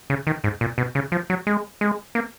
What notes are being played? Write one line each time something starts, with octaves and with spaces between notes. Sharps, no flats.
C#3
D#3
G#2
A#2
B2
C#3
F3
F#3
G#3
G#3
A#3